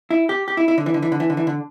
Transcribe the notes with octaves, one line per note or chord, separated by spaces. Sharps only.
E4
G4
G4
E4
E4
D3
E3
D3
E3
D3
E3
D3
E3
D3